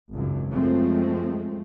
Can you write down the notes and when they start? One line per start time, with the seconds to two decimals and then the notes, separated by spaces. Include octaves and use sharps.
0.13 G#1 C#2 F#2
0.51 F#2 F3 G#3 A3 C4